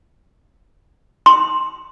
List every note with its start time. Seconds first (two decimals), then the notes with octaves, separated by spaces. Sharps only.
1.26 C6